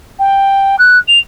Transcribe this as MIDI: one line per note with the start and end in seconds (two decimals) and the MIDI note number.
0.19 0.76 79
0.79 0.98 90
1.08 1.19 101